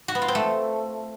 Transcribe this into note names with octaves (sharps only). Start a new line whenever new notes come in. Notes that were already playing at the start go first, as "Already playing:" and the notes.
F#4
B3
F4
C4
A3